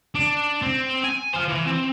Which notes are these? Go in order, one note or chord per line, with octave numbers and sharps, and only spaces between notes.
D4
C4
G#5
C5 F5
E3
C4